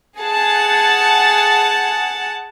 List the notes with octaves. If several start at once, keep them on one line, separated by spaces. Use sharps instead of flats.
G#4 F#5 A5